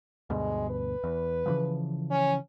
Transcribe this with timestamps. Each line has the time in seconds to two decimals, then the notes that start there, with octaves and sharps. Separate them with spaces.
0.30 D2 G2 B2 G#3
0.69 B4
1.04 E2
1.46 C#3 E3 F3
2.10 C#4